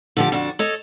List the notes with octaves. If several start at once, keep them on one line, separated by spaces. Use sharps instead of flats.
D3 F3 G4
F2 D3 D4 F#4
A4 C#5 D#5